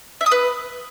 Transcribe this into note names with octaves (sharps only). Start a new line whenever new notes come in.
E5
D#6
B4